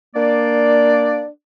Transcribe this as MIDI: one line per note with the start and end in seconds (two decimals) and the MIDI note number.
0.16 1.23 58
0.16 1.27 62
0.16 1.23 74